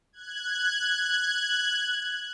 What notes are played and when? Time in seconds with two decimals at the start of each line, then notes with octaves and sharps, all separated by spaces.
0.13 F#6 G#6